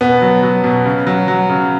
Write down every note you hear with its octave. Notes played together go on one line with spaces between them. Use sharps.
B2 B3
F#3
F#3
B2
C#3
F#3
F#3
C#3